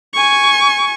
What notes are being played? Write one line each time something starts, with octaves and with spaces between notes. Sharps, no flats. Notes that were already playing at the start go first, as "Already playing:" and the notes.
G#5 C#6